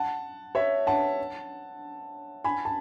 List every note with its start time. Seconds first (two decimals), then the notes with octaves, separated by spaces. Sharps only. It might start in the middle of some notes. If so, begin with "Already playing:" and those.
Already playing: F#5 A5
0.55 C#5 E5
0.87 F#5 A5
2.44 G#5 B5
2.65 A5